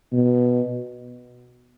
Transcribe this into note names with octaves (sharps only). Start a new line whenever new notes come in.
B2